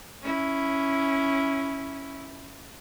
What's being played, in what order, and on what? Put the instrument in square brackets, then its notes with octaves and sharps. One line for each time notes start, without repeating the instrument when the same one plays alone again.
[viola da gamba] C#4 E4